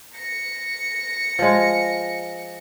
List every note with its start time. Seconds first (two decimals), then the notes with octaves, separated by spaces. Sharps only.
0.14 A#6 C#7
1.39 F3 G#3